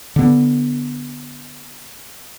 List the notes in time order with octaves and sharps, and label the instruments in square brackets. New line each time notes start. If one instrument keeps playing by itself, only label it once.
[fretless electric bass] D3 B3